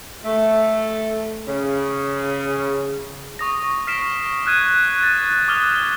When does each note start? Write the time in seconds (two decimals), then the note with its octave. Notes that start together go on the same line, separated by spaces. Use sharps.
0.24 A3
1.48 C#3
3.39 C#6 D#6 A#6
3.87 F6 B6 C7 D7 E7
4.46 F6 F#6 G#6 D#7
5.01 A6 D#7
5.48 D6 D#6 F6 G7